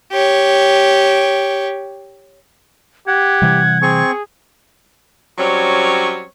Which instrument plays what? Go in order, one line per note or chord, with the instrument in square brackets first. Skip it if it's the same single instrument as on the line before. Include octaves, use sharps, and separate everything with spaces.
[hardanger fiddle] G4 C#5
[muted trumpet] G4 [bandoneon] F#5 [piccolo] G#6
[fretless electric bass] C3 E3 G3
[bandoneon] C4 C#6 [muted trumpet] G#4
[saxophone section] F#3 G3 C4 C#4 C#5